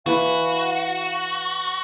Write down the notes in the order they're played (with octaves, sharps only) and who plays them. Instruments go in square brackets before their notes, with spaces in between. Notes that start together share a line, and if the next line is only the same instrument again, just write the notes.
[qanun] E3 B4 D6 [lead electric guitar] F#4 [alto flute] F5